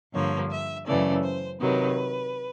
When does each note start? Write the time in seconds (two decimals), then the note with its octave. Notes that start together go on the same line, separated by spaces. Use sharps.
0.13 G2 D3 F3 A#3 C#5
0.50 E5
0.86 F#2 C#3 E3 A3 D5
1.23 C5
1.59 C3 D#3 F#3 B4